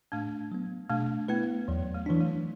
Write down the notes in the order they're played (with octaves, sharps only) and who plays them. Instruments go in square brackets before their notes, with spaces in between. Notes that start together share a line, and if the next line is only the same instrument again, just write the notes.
[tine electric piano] A2 [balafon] A3 D4
[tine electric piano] F#3 B3
[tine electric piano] B2 [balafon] A3 D4
[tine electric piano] A3 E4 B4 [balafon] B3
[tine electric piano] E2 [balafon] F#3
[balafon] A3
[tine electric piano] E3 D4 [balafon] F#3
[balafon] A3